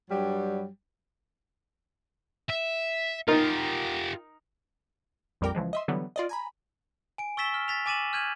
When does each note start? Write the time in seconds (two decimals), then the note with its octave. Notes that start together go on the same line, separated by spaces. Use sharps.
0.10 G2 F#3 G3
2.50 E5
3.28 D#4 F4 G4 A#4
5.41 A#1 F2 G3 A#4 G5 D6
5.55 C#2 E3 F3 G#3
5.73 D#5 E5 C6
5.88 D3 E3 F#3 G3 B3
6.16 F4 D5 D#5
6.29 G#5 A#5 B5
7.18 G#5 D7
7.37 C#6 E6 A6 B6 E7 G7
7.54 F6
7.68 A6 B6 F7
7.86 G#5 D6 A6 D#7 E7 F#7
8.13 F6 G6 G#6 D#7 F#7